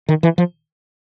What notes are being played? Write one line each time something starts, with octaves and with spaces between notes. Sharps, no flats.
D#3
E3
F3